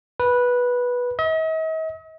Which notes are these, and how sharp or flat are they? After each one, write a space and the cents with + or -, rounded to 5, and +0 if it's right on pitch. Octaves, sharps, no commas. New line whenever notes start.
B4 -10
D#5 +45